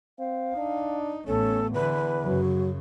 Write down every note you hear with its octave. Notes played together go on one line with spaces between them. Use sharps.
C4 F5
D4 D#4
A1 A3 B3 C#4 A4
E2 D3 E3 B4
F#2 C#3 F#3